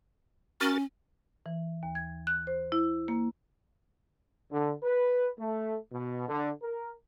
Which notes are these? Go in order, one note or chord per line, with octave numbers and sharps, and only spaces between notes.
C#4 F#4 A#4 A6
E3
D#2
G#6
F#6
C5
E4
A#3
D3
B4
A3
B2
D3
A#4